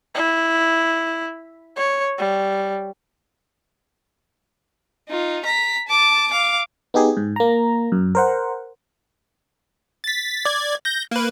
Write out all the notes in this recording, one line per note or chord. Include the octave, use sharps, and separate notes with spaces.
E4
C#5
G3
D#4 F4
A#5 B6
A5 D6
F5 D6
B3 D#4 G4 G#4
G#2
A#3 A#5
F#2
A#4 C5 F#5
A6 B6
D5 G#6
G6 A#6
A#3 B4